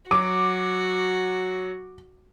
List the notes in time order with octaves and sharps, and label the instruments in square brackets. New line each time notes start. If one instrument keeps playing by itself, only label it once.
[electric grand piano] F#3 [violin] F#4 [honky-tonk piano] D6